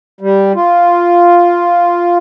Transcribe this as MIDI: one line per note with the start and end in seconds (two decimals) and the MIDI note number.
0.21 0.52 55
0.55 2.18 65